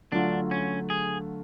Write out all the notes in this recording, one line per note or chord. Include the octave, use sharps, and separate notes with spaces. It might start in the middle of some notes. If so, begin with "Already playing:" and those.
D3 F#3 A3 D4 F4
C#4
G#4